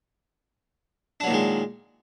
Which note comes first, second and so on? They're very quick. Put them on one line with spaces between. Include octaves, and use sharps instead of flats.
D4 F#3 A#2 D#3 G#3